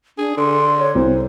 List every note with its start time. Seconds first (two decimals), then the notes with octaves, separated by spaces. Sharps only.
0.18 D4 G#4
0.37 D3 C6
0.79 C#5
0.95 C2 C5